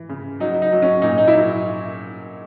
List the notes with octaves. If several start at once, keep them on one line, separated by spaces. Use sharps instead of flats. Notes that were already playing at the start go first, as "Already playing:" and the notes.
Already playing: E3
C#3
F#3 D#4
D#4
F#3
C#4
A#2 D#4
D#4
E4
F#3 D#4